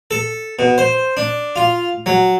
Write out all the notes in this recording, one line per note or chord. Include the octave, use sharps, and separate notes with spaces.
A4
B2
C5
D4
F4
F#3